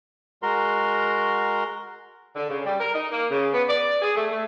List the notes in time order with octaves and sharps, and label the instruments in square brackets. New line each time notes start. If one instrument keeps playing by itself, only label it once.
[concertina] G#3 F#4 A#4 A#5 C6
[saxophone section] D3
C#3
G3
A#4
D#4
A#3
C#3
B3
D5
G#4
A3
A3